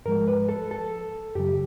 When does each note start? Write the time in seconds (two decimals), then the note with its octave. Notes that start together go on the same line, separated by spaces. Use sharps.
0.05 G#2 F3 G#3 A#4
0.28 B4
0.49 A4
0.71 A4
1.35 F#2 C#3 F#3 G4